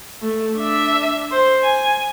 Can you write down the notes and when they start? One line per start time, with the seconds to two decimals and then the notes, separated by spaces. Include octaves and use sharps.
0.22 A3
0.56 D4 E5
1.32 C5
1.63 G#5